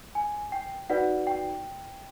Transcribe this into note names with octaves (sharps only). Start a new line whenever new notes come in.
G#5
G5
D#4 F#4 B4 D5 F#5
G5